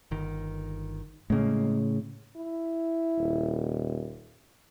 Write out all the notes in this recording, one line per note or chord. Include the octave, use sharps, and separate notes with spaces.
G1 D#3
A2 C#3 G#3 A#3
E4
D#1